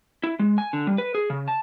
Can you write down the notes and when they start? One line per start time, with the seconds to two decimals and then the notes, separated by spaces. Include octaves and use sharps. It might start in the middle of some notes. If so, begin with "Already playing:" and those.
0.24 E4
0.39 G#3
0.58 G#5
0.73 D3
0.87 G3
0.98 B4
1.15 G#4
1.30 C#3
1.48 A5